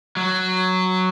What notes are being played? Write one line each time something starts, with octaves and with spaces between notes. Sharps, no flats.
F#3